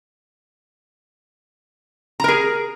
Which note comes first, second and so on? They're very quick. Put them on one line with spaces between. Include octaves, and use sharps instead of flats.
A#5 A#4 G#4